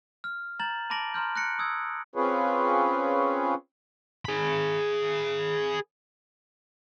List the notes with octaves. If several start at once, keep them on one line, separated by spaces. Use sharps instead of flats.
F6
A#5 G6 A6 F#7
A5 B5 D6 A#6 D7 F#7
A#5 C6 F6 G6
F#6 A#6 C#7 D7
D#6 E6 G#6
C4 C#4 F4 G#4 B4 C#5
G#4 B5